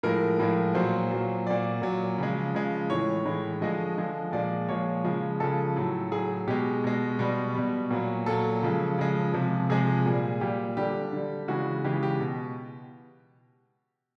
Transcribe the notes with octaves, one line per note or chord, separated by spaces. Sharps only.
A2 F3 G#3 A#4
A2 F3 G#3
A#2 F#3 C5
A#2 F#3
A#2 F#3 D5
A#2 F#3
C#3 F3 G#3
C#3 F3 G#3
A2 E3 G#3 C#5
A2 E3 G#3
D3 F3 G#3 D#5
D3 F3 G#3
A#2 F3 G#3 D5
A#2 F3 G#3 C#5
C#3 F3 G#3
C#3 F3 G#3 A4
A2 F#3
A2 F#3 G#4
B2 G#3 G4
B2 G#3
B2 G3
B2 G3
A#2 F#3
A#2 F#3 A4
C#3 F3 G#3
C#3 F3 G#3
C3 F3 G#3
C3 F3 G#3 G#4
A#2 G3
A#2 G3 G4
D3 G3 G4
D3 G3
C#3 E3 G#3 F#4
C#3 E3 G#3 G4
G4
B2